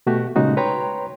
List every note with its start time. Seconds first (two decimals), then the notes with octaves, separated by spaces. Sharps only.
0.07 B2 A3 F#4 G4
0.36 A#2 C#3 G#3 D#4 F#4
0.57 B4 C#5 G5 A#5 C6